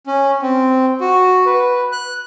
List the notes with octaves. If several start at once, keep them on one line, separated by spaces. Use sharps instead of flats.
C#4
C4
F#4
B4
F#6